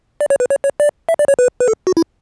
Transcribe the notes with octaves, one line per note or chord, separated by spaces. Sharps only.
D5
C#5
B4
C#5
C#5
D5
E5
D5
C#5
B4
B4
A4
F#4
E4